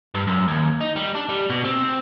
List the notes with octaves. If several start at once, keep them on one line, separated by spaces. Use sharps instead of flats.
G2
F#2
D#2
D#4
G3
D4
G3
B2
C4